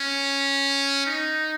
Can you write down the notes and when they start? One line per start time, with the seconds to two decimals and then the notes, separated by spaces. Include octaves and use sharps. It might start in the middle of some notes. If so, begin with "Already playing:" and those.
Already playing: C#4
1.06 D#4